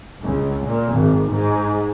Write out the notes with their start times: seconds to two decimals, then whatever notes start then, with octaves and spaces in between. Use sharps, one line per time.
0.24 C#2
0.67 A#2
0.95 G#1
1.33 G#2